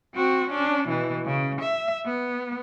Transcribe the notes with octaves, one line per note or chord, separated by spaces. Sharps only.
C4 F#4
C#4 D4
B2 E3
C#3
E5
B3